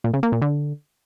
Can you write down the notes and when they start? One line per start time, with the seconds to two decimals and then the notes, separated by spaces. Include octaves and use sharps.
0.04 A#2
0.14 C#3
0.23 A#3
0.32 A#2
0.42 D3